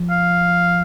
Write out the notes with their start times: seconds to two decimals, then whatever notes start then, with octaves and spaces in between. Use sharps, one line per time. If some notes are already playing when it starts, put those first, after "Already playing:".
Already playing: F3
0.10 F5